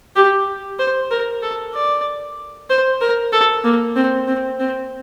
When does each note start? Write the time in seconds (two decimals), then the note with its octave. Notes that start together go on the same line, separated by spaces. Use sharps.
0.16 G4
0.79 C5
1.11 A#4
1.42 A4
1.74 D5
2.70 C5
3.01 A#4
3.33 A4
3.64 A#3
3.96 C4
4.28 C4
4.60 C4